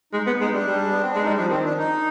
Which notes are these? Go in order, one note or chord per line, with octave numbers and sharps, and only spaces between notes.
G#3 D#4
B3
G#3 D#4
G3 D4
G3
G#3
B3
C4
G#3 D4
G3 D#4
F3 D4
D#3 C4
D4
D#4